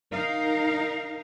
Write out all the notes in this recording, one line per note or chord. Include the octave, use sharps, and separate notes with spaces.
D#4 A#4 F5